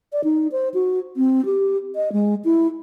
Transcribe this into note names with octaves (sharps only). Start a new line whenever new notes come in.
D5
D#4
C5
F#4
C4
G4
D#5
G#3
E4